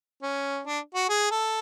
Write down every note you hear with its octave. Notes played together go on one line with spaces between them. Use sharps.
C#4
D4
F#4
G#4
A4